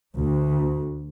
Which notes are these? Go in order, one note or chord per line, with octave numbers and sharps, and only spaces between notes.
D2